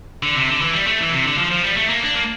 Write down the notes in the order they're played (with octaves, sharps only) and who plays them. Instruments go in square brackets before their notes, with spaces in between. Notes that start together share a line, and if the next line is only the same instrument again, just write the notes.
[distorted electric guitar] D3
C3
D3
E3
G3
A3
E3
C3
D3
F3
F3
G3
A3
A#3
D4
A#3